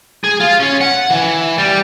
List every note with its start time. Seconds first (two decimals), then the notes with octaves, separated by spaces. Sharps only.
0.24 G#4
0.40 F4
0.60 C#4
0.81 F#5
1.11 E3
1.58 G3